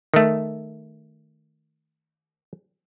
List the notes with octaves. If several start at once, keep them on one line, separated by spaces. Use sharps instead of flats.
D#3 A3